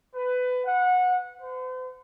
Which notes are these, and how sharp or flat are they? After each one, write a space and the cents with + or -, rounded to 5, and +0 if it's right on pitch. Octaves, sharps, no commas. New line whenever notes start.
B4 +20
F#5 -20
C5 -45